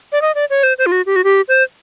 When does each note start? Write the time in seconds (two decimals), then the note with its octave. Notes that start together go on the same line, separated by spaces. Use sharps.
0.12 D5
0.22 D#5
0.35 D5
0.50 C#5
0.63 C5
0.78 C5
0.86 F4
0.92 F#4
1.06 G4
1.16 F#4
1.24 G4
1.48 C5